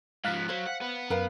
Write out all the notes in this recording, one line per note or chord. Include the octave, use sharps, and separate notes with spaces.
G#2 F3 F5 F#6 B6
F#3 C5
F#5
B3
F#2 A#4 B4 F5